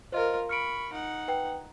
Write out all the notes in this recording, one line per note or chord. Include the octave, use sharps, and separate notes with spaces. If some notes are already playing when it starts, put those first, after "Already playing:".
F4 A#4 C5 D#5
B5 C#6 F6 C#7 D7
D#4 F#5
B4 G5